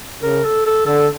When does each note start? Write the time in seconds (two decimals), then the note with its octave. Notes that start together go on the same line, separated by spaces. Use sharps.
0.23 C#3 A#4
0.44 A4
0.66 A4
0.86 D3 A4